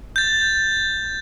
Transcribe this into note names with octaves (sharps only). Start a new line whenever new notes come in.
G6 A6